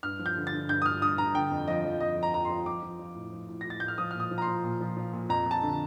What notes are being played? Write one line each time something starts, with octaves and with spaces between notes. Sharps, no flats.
G2 F6
F3
G6
D3
A6
D3
G2 G6
D#6
G2 F6
G2 D#6
G2 A#5
D3 G5
F2
F3 D#5
F3
F2 D#5
F3
A#5
F2 A#5
F3 C6
F3 D6
F3
F3
A2
F3
A2
A#6
A2
A6
A2 G6
F6
F3 D#6
A#2 F6
D#6
F3
A#5
C6
F3
A#2
F3
F3
A#2
F2 A#5
F2
A5
D3